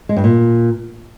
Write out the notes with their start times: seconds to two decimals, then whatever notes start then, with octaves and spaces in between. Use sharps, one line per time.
0.09 G#3
0.17 G2
0.24 A#2